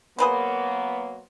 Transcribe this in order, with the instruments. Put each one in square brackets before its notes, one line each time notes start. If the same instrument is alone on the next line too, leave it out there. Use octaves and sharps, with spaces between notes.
[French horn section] F#3 A#3 B3 [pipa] G#4 B4 C5